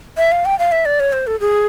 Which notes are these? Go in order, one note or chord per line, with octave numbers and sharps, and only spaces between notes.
E5
F5
G5
F5
E5
D5
C#5
C5
A4
G#4